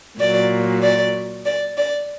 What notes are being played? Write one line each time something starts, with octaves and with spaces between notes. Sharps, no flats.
A#2 F#3 D5
D5
D5
D5